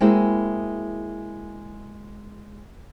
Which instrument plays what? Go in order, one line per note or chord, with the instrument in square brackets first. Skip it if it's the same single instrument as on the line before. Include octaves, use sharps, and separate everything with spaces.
[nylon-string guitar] G#3 A#3 C4 E4 F#4 G#4